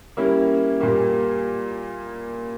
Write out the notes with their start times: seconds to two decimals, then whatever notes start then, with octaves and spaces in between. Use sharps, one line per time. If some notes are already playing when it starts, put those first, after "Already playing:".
0.17 G3 A#3 C#4 E4
0.81 A#2 G3 A#3